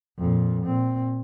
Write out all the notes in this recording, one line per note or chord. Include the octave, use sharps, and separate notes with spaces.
F2 A#2
A#2 C4